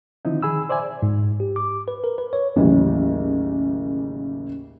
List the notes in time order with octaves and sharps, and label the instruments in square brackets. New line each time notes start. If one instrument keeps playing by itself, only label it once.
[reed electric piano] D3 D#3 F3 C4 D#4 E4
D#3 G#4 G#5 B5 E6
C5 D5 E5 G#5
[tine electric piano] G#2
G4
D6
B4
A#4
B4
C#5
[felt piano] A1 D#2 C#3 E3 F#3